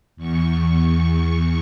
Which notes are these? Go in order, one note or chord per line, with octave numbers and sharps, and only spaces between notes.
E2 C#6